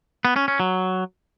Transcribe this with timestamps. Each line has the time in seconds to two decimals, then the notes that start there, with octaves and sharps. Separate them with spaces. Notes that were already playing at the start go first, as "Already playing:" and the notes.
0.25 B3
0.36 C#4
0.48 C#4
0.60 F#3